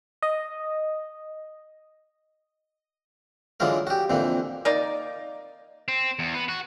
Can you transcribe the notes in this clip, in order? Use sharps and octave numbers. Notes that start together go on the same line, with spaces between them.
D#5
D3 E3 F#3 G#3 F4 A#4
F#4 G4
F2 A#2 D3 E3
A#3 D#4 D5
C4
E2
B3
F#4